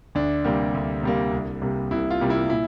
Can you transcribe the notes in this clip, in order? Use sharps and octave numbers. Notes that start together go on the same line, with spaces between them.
D2 D4
C3 G3 A#3
D2
C3 G3 A#3
C2
C3 G3 A#3
C2 E4
F4
C3 G3 A#3
E4
A#2 E4